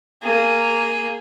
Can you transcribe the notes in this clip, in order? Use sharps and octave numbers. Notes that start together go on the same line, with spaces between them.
A#3 G#4